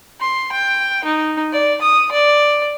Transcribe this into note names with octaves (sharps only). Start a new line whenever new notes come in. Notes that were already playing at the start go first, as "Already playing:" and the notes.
C6
G5
D#4
D5
D#6
D5